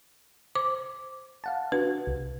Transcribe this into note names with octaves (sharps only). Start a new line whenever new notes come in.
C5 D6
F5 F#5 A5
D4 F#4 B4
C2